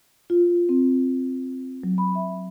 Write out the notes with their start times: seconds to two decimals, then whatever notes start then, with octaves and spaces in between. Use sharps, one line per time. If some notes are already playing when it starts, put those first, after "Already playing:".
0.30 F4
0.69 C4
1.84 F#3
1.98 B5
2.15 E5